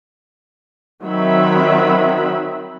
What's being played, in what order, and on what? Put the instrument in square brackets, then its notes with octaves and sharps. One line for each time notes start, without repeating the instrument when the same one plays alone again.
[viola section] D#3 F#3 C4 E5 B5